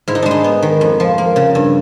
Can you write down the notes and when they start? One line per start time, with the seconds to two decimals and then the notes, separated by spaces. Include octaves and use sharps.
0.08 G#2 E4
0.15 D#4
0.22 G#3 D4
0.31 D#4
0.44 B3
0.62 D#3
0.81 F2
1.00 F3
1.18 A#3
1.36 C#3
1.55 G2